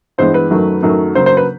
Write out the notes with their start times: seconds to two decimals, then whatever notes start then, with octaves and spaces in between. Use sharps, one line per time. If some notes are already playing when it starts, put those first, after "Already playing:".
0.18 G2 E3 G#3 B3 C5
0.34 B4
0.51 F#2 D#3 F#3 A3
0.83 F#2 D#3 F#3 A3
1.15 C#3 F#3 A#3 C5
1.26 C5
1.37 B4